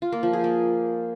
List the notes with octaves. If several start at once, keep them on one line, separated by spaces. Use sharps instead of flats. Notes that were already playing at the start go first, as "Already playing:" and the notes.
F4
A#3
F3
G#4
A#3